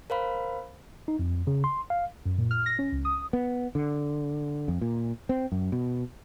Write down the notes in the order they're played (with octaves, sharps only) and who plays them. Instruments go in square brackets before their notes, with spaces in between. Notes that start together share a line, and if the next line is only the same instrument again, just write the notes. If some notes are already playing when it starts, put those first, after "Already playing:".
[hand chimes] A#4 C5 F5 B5
[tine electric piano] D#4
F2
C#3
C6
F5
[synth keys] F#2
A#2
F6
A#6
C#4
C#2
D#6
[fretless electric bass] B3
D3
F2
A#2
C4
F#2
B2